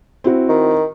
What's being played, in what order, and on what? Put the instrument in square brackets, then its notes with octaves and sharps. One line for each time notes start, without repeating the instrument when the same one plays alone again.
[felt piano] C4 E4 F#4
[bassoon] D#3